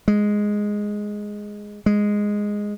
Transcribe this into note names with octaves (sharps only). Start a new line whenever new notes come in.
G#3
G#3